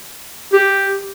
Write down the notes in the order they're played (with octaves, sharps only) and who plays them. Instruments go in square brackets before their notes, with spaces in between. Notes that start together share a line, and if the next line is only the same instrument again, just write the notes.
[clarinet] G4